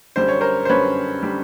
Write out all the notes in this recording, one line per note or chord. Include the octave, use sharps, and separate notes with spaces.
F#2 D3 G3 C5
C#5
A#4 C5
C5
F#2 D3 G3 B4 C#5
D3 G3